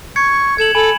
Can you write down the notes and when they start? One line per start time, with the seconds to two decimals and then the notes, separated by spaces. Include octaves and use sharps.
0.16 C#6 G#6 C#7
0.58 A4 G#6 E7 F#7
0.75 A4 G#5 B5 F#7